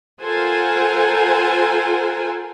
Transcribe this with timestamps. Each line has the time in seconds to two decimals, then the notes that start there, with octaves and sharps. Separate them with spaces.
0.22 F4 A4 A#4 C5 F#5 G#5